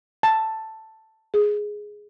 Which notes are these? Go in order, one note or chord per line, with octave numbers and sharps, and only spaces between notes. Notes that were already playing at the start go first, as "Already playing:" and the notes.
A5
G#4